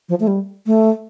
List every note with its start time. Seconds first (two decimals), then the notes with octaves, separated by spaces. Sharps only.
0.09 F3
0.20 A3
0.27 G3
0.66 A3